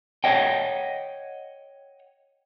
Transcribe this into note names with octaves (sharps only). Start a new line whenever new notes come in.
C#5 D#5 F#5 G5